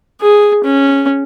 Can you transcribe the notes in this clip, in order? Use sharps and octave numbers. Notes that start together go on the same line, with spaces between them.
G#4
C#4